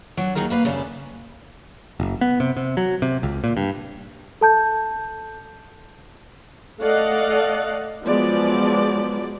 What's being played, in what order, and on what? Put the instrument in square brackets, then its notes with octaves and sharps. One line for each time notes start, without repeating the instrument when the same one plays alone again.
[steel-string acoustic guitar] F#3 D4
D#2 D#4 F#4 G#4 A#4
A#3 B4 D5 F5
F#2 C#3 G3 D4
[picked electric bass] F#1
B3
C3
C3
F#3
C3
C#2
A#2
G2
[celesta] A4 A5 G6
[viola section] A3 A4 D5 D#5 F5 F#5
F3 F#3 G#3 B3 D5